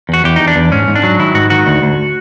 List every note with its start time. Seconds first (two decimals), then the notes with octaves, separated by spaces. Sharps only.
0.09 E2 F#4
0.24 E2 G4
0.36 E2 D#4
0.48 D4
0.56 E2
0.72 G#2 C#4
0.88 G#2
0.95 D4
1.03 F#3
1.19 D#3 E4
1.35 G#2 F#4
1.50 D#3 F#4
1.67 D2
1.82 D2